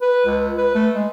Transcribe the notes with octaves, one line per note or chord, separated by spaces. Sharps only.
B4
C#2
B4
A3
G#3